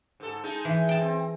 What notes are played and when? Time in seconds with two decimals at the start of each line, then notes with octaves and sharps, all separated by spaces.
0.20 G#2 A4
0.43 G#3 D#4
0.65 E3
0.89 G5 A5
1.01 C4